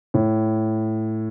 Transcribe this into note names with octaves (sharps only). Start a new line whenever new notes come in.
A2